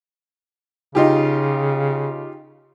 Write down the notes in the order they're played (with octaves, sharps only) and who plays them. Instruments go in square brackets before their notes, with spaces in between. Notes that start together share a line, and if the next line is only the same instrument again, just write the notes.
[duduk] C#3 [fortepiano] D#4 F4 G4